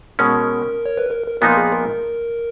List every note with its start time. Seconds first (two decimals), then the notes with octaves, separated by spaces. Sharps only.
0.19 B2 G#3 C#4 A#4
0.86 C#5
0.98 B4
1.10 A#4
1.27 A#4
1.41 A#2 F3 B3 D#4 A#4
1.57 G#4
1.72 A#4